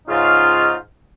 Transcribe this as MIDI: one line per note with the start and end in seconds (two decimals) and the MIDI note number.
0.08 0.74 44
0.08 0.74 49
0.08 0.74 61
0.08 0.74 63
0.08 0.74 65